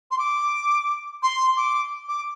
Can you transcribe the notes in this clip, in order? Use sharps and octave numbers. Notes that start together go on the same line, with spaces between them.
C6
D6
C6
D6
D6